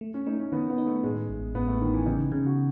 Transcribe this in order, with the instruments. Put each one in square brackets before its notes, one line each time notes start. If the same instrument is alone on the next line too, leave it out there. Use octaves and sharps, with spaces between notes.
[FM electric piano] A3
[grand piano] C#4
[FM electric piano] A3 [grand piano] D#4
[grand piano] C#4
[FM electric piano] D#3 [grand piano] B3
[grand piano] B3
[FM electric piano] D#4
[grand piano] A3
[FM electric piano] A2 [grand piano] G#3
[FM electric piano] A1
[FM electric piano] A1 [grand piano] B3
[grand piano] A3
[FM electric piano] A1 [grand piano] D#3
[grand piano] E3
[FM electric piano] C#3 [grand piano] D#4
[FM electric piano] C#3
[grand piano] F#4